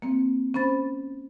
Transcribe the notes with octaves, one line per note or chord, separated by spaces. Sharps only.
A#3 C4
C#4 C5 B5 A6